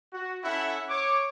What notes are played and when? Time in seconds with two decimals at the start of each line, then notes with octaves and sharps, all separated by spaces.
0.13 F#4
0.43 C#4 E4 A4 E5 F#5
0.88 C#5 D6